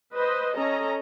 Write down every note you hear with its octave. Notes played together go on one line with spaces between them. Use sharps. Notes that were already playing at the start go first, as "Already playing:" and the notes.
B4 C5 D#5
C#4 A4 D#5 A#5